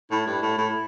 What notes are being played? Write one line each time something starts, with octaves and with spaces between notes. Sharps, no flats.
A2 E4
G2
A2
A2